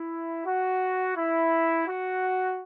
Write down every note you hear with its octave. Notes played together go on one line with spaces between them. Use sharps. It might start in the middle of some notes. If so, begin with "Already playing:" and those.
Already playing: E4
F#4
E4
F#4